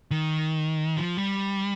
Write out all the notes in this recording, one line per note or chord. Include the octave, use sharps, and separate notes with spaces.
D#3
F3
G3